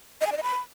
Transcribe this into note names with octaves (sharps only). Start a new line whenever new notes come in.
D#5
G#5
D5
D#5
B5